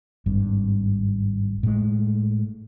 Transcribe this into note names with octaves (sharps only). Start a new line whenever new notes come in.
G#1 G2
A2 G#3